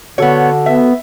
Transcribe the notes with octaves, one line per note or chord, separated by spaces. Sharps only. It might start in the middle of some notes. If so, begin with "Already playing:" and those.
D3 B3 F#4 A4 C#5
B3 E5